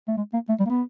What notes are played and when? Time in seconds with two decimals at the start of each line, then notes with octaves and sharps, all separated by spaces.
0.08 A3
0.17 G#3
0.33 A#3
0.49 A3
0.60 G3
0.65 A#3
0.70 B3